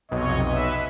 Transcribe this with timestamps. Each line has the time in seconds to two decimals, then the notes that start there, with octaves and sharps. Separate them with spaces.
0.12 B1 F2 C3 C#5 D#5
0.50 B4 E5